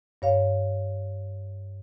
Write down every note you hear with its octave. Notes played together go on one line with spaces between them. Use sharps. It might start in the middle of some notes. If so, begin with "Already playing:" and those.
G2 C#5 F5